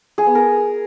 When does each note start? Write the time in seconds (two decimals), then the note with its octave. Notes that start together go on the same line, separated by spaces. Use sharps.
0.18 G#4
0.26 B3
0.35 A#4